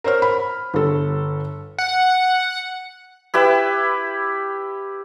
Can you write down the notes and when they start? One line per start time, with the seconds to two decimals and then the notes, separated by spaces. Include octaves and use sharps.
0.04 A#4 C5 C#5 F6
0.22 B5
0.74 G1 A4
1.78 F#5
3.34 E4 G4 B4 E5